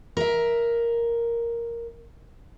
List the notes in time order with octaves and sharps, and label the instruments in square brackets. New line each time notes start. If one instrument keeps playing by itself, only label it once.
[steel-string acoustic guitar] A#4 E5